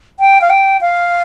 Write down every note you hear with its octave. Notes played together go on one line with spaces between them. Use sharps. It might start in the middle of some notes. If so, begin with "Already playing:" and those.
G5
F5
G5
F5